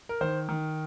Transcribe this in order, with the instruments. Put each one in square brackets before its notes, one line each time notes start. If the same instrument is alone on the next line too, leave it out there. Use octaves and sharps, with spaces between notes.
[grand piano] A#4
D#3 C5
D#3